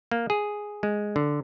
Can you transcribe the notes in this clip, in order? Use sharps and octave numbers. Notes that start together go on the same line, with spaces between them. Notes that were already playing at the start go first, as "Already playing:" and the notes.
A#3
G#4
G#3
D3